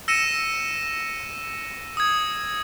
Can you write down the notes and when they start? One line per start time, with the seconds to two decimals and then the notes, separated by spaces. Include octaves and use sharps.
0.08 E6 A#6 C#7 D#7 E7
1.97 D#6 G#6